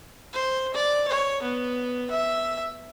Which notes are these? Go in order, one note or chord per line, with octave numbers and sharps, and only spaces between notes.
C5
D5
C#5
B3
E5